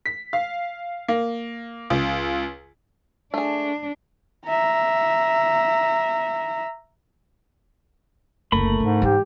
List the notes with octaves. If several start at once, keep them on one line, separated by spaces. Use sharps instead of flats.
B6
F5
A#3
C#2
A3 D4 G#4
E5 A#5
F#1 D2 A3 A#4 B5
G#2 D3
E3 G#3 G4